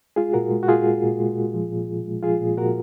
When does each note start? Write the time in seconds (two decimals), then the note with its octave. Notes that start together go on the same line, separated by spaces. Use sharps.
0.16 G#3 F4 G#4
0.33 A#2 F#4 A#4
0.51 G#3
0.63 F#4
0.68 A#2 F4 G#4
0.86 G#3
1.03 A#2
1.20 G#3
1.37 A#2
1.54 F3
1.72 A#2
1.88 A#2
2.06 G#3
2.23 F3 F4 G#4
2.41 A#2
2.58 A#2 F#4 A#4